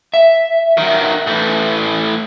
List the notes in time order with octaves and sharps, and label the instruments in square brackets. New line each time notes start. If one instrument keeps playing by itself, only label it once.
[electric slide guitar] E5
[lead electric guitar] D#3 F#3
A2 E3